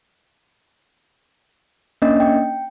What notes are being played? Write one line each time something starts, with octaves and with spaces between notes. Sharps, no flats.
A#3 C#4 D4 D#5
G5